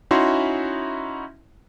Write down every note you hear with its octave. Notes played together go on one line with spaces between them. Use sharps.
C#4 D#4 E4 F#4 E5 C6